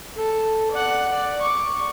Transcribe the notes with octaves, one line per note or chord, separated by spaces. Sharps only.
A4
D5 F#5
D5
C#6 D6